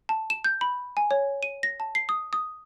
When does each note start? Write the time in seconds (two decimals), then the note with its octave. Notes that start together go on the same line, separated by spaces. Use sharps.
0.09 A5
0.30 E7
0.44 G6
0.61 B5
0.97 G#5
1.11 C#5
1.43 D#7
1.63 A#6
1.80 A5
1.95 C7
2.09 D#6
2.33 D#6